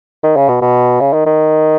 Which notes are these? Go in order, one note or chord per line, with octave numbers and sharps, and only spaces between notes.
D#3
C#3
B2
B2
C#3
D#3
D#3